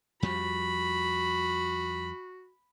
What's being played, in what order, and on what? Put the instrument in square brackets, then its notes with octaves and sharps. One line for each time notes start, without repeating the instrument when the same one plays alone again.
[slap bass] F2 F3 G3 [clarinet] F#4 [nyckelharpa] B5